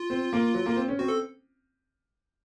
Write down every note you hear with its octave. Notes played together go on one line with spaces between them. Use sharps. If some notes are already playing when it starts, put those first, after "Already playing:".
Already playing: F4
C4
A#3
F#3
A#3
C4
C#4
C4 F#4
A4